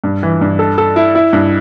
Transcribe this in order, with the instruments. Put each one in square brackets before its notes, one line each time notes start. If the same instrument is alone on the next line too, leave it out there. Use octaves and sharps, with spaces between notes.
[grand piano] G2
E3
G2
A4
A4
E4
E4
G2